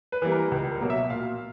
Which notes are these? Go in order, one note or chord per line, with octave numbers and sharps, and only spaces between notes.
B4
E3 G3 A#3
A#4
C#2
A#4
B2 F#3 A#3
E5
A#2 F5